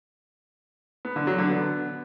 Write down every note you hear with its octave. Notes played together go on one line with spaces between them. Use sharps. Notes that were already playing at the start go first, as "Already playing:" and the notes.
B3
D3
F#3
D3
B3